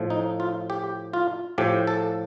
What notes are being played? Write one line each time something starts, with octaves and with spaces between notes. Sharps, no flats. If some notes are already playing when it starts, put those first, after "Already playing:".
Already playing: A2 F3
D#4
F4
G4
F4
A2 F3 G4
A4